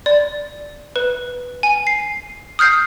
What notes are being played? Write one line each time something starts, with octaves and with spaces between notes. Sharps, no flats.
D5
B4
G#5
C7
D#6 F6 G6 C7